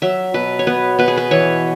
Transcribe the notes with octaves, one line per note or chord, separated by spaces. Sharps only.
F#3 E5
B2 B4
C#5
B3 B4
B2 B4
G#4
B4
E3 C#5